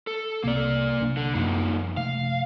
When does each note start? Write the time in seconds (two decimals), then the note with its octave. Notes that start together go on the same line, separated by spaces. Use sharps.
0.07 A4
0.43 C2 C3 A#3 C4 D5
1.00 B1 C3 D4
1.17 D3
1.35 F#2 F3 A#3 D#4
1.97 C3 F3 A3 F5